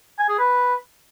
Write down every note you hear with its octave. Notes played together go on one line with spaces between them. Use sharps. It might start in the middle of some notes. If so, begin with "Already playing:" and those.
G#5
G#4
B4